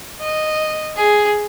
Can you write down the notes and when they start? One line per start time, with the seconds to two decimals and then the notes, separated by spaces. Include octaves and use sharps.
0.20 D#5
0.96 G#4